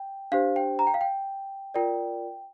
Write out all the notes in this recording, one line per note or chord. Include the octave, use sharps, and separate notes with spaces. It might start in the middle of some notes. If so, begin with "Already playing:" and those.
Already playing: G5
D4 G4 C5 F5
G5
A#5
G5
F5
G5
F4 A#4 D5 G5